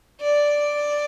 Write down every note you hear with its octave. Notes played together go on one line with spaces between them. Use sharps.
D5